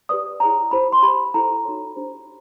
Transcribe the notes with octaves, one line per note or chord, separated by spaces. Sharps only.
G4 B4 D5 D#6
E4 G#4 C#5 A#5
E4 G4 C5 B5
C6
G4 C5 B5
E4 A4 C5 A#5
D#4 F#4 A4 C#5
D4 G4 C5